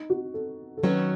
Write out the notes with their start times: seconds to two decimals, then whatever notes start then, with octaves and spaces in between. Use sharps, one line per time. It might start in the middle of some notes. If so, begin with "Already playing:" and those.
Already playing: D#4
0.10 F#4
0.34 A4
0.77 A4
0.83 D#3 F#3 C#4 F#4 B4